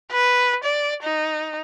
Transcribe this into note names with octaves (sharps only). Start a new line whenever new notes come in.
B4
D5
D#4